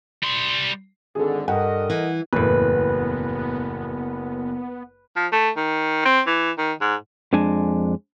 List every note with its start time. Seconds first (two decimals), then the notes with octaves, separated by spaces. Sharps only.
0.23 G3 C6
1.15 G#1 D3 G#4 A4
1.48 G2 A4 A#4 D#5 F#5
1.90 E3
2.33 F#1 E2 A2 B3 B4
5.16 F3
5.33 A3
5.57 D#3
6.06 C4
6.27 E3
6.58 D#3
6.81 G#2
7.33 F2 G#3 D4 G#5